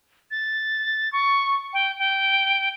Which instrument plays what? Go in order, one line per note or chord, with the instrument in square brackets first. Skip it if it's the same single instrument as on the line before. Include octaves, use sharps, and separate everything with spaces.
[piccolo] A6
C#6
G5
G5